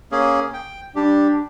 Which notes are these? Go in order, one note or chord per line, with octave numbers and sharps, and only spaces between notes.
A#3 C#4 G#4
G5
G3 D4 G4